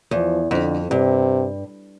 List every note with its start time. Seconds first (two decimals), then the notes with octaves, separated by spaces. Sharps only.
0.11 E2 F3
0.51 F2 D3
0.91 G2 C3